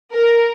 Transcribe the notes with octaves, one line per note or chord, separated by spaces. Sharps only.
A#4